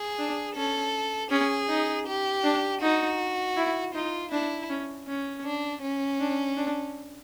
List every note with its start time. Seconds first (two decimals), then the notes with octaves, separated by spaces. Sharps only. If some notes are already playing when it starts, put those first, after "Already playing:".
Already playing: G#4
0.19 D4
0.56 C#4 A4
1.31 C#4 G#4
1.69 D#4
2.07 G4
2.43 D4
2.82 D#4 F#4
3.57 E4
3.95 D#4 F4
4.32 D4 E4
4.69 C#4
5.07 C#4
5.45 D4
5.82 C#4
6.20 D4
6.57 D4